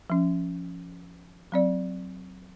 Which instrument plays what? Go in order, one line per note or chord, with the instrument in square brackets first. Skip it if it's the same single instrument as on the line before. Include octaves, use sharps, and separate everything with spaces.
[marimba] F3 C#4
F#3 C4 D5